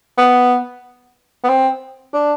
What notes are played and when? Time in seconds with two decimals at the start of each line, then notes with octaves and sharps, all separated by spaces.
0.18 B3
1.44 B3
1.49 C4
2.14 D4